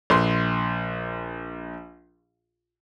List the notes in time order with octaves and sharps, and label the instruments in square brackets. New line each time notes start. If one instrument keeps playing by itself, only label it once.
[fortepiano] A#1 C6